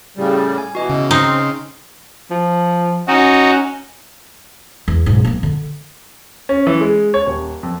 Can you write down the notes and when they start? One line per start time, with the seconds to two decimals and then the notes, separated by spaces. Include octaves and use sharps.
0.17 A2 C#3 G3
0.58 G#5
0.75 B2 E3 F#4 D#5
0.89 C#3
1.11 C4 D#4 C6 F6 C7
2.31 F3
3.08 C#4 D#4 F#4
4.88 E2
5.06 B1 G#2
5.25 A#3 C4
5.43 D3
6.49 C#4
6.67 E3
6.81 G#3
7.14 C#5
7.26 D#1
7.63 F2